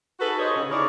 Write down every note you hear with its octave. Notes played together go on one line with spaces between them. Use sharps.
D#4 F#4 G#4 A4 B4
D#4 G4 C5 C#5 D#5
C#3
D#4 E4 G#4 A#4 C#5 D5